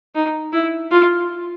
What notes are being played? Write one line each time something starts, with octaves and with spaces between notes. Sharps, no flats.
D#4
E4
F4